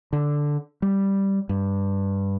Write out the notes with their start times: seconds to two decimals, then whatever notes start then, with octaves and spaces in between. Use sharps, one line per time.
0.13 D3
0.82 G3
1.49 G2